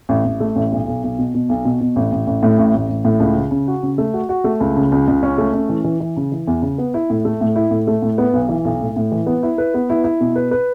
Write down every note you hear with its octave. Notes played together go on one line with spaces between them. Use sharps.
A1
A1
A3
A1
B1
B1
B1
B2
B2
B1
B2
B2
A1
A1
A1
A2
A1
A1
A1
A2
C#2
C#3
C#3
F#4
C#3
A3
F#4
F#4
A3
C#2
C#3
C#2
C#2
C#4
A3
C#4
E3
E3
E3
C#3
E3
E2
C#3
B3
E4
A2
A3
A2
E4
A2
A3
A2
B3
B1
E3
B1
A2
A2
E3
B3
E4
B4
B3
E4
E4
B2
B4
B4